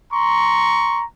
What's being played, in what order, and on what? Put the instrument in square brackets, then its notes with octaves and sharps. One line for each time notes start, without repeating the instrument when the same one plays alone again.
[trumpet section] A#5 C6 C#6